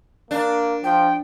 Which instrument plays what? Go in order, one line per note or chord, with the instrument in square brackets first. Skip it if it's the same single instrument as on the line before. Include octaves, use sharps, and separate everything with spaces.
[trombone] A#3 [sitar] D4
[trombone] F3 [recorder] G5